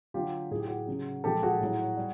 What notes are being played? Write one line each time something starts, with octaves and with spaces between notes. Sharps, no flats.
D3 F#3 F4 G4
A2 F#3 G#4
G4
F#4 G#4
C#3 F#3
A#2 F3 G#3 G4 A4
F#4 G#4
A2 F#3
G3